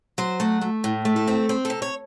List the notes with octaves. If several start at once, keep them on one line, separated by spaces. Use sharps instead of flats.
F#3 C5
A3 F#4
A3
A2
A3
A4
C4
C4
A4
C3
C#5